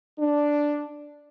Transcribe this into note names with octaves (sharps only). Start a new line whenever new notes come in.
D4